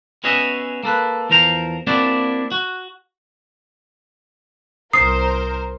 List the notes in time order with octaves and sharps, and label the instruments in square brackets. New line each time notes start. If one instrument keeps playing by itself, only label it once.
[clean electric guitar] B3 C#4 F#4 G#4 D#5 E5
A#3 A4 B4
E2 F3 A#4 C5 A#5
A#3 C4 D4 E4 F#4 D5
F#4
[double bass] C2 [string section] A#4 C5 [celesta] D#6 [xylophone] C7